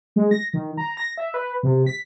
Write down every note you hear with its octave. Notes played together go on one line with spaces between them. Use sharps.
G#3
A#6
D#3
A#5
A#6
E5
B4
C3
B6